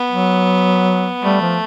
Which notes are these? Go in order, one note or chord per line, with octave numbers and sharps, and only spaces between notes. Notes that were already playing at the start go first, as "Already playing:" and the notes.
Already playing: B3
F#3
G3 A3
F3